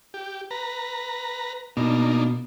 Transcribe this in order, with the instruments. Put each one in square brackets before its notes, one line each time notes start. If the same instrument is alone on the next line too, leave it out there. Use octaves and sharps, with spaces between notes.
[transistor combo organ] G4
B4 A#5
[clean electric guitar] B2 [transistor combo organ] A#3 D4 D#4